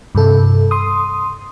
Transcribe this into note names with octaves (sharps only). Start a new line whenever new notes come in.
G2 C3 A4
C6 D#6